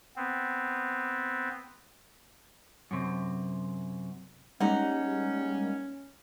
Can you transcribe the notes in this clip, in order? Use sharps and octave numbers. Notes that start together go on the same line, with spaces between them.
B3 C4
F#2 C3
G3 G#3 A#3 C#4 D#4 F#5